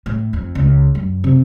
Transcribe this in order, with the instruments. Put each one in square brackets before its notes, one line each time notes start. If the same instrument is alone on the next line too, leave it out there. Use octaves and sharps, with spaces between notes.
[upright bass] A2
F2
C#2
F#2
C3